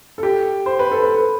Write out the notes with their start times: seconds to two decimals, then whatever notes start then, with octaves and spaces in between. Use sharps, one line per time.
0.18 A4
0.23 G4
0.66 C5
0.79 B4
0.91 A4
1.02 B4